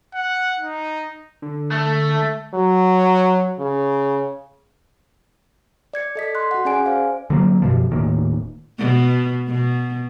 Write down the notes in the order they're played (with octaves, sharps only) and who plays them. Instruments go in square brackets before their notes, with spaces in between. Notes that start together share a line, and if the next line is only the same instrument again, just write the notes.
[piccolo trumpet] F#5
D#4
[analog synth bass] D3
[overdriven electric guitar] A3
[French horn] F#3
C#3
[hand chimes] D5 G#6 C#7
A4 D#5 B6
C6 F#6
F#4 F#5
C#4 G#4 D5 G#5 D7
C5 F5
[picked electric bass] D3 F#3 A#3
F#2 B2 F3
D#1 A2 D#3 A#3
[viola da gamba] B2
B2